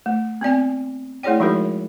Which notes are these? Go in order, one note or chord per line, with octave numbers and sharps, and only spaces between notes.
A3
B3 C4 D5 G#5
A3 E4 G#4 C#5 D5 G5
F3 G#3 D#4 F#4 G#4 A#4